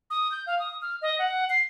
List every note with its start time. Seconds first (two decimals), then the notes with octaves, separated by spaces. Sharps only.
0.10 D#6
0.32 G6
0.47 F5
0.59 D#6
0.82 F6
1.02 D#5
1.19 F#5
1.50 C7